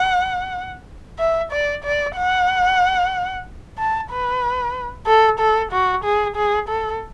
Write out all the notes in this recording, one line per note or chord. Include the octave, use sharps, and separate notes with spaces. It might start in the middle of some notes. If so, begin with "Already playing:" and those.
Already playing: F#5
E5
D5
D5
F#5
A5
B4
A4
A4
F#4
G#4
G#4
A4